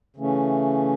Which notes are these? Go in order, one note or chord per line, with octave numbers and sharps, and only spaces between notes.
C#3 E3 A3 C#4